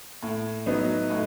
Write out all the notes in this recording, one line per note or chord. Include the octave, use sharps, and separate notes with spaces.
A2
F#3 B3 D#4
A2